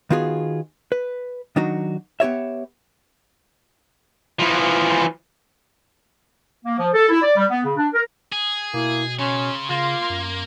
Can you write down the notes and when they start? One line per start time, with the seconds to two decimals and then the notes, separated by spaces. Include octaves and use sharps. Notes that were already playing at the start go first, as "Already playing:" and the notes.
0.10 D#3 B3 F4 F#4 G#4
0.92 B4
1.56 D#3 F#3 D4 D#4 F#4
2.20 B3 G4 C#5 E5
4.39 E3 F3
6.65 A#3
6.79 F3
6.94 A4
7.09 E4
7.22 D5
7.36 G3
7.49 B3
7.65 C#3
7.77 D4
7.94 A#4
8.33 G#4
8.74 B2 A#3 E4
9.19 C#3 C#4 C6
9.70 C#3 A#3 F4
10.10 F#2